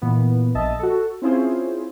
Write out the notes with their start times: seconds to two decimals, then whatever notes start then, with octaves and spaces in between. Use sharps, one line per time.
0.02 A#2 E3 B3
0.55 A#1 D#5 E5 A5
0.79 F#4 A4
1.22 C4 C#4 E4 F4 G#4 C5